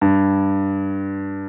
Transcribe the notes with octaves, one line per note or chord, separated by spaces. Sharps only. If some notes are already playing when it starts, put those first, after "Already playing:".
G2